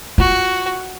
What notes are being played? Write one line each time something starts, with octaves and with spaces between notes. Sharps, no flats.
F4 F#4